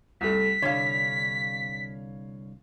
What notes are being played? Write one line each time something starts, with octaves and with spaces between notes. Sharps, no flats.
C2 A3 B6
C2 D3 C#5 F5